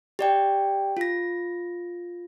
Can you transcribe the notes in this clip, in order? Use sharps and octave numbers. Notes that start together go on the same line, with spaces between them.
G4 D5 G5
F4 A#6